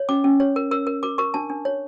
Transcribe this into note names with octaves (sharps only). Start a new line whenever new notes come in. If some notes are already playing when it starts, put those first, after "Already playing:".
Already playing: C#5
C#4 D6
C#4
C#5
A#4
A#4 E6
A#4
A#4 D6
A#4 C#6
D4 A5
D4
C#5